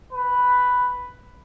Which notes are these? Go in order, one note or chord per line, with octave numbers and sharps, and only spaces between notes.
B4